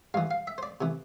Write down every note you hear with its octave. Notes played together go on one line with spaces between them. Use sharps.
G2 E3 F5
F5
E5
C5
D5
C3 E3